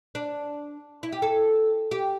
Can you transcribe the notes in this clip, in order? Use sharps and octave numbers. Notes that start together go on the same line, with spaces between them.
D4
E4
G4
A4
G4